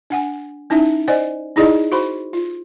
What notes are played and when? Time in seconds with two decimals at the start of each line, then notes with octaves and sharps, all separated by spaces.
0.10 D4 F#5 G#5
0.70 C#4 D#4 E4 E5
1.08 C5 D5 D#5 G#5
1.56 D#4 E4 G#4 D5 D#5
1.92 F#4 C5 B5 C6
2.33 F4